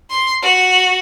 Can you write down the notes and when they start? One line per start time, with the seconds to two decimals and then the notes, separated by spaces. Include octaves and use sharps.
0.10 C6
0.42 F#4